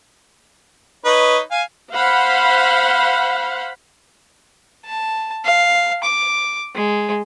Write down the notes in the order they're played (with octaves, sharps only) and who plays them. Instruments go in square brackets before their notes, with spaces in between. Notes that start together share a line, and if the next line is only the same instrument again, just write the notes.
[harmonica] D#4 B4 C#5
F5 G#5
[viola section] C5 F5 F#5 B5
[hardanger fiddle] A5
F5
D6
G#3